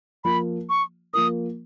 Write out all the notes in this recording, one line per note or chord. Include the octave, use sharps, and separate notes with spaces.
F3 A#3 F4 A#4 B5
C#6
F3 A#3 F4 A#4 D#6